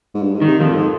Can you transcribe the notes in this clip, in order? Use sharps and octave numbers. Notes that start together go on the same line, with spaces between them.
G#2
G2
G#2
D#3
C3
F2 A#2 F3
G#2